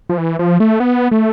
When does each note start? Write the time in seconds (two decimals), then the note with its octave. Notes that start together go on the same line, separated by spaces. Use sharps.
0.09 F3
0.18 E3
0.39 F3
0.60 A3
0.80 B3
1.11 A3